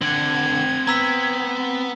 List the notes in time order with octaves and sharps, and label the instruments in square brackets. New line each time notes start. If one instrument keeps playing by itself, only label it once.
[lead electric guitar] D3 [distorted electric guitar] C4 F#5 [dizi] G#6
[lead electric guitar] B3 [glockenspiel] A#5 E6 B6